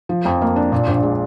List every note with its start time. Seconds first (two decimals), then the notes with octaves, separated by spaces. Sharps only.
0.09 F3
0.25 F2
0.41 A#3
0.56 D4
0.72 A#2
0.87 A#1
1.03 G#3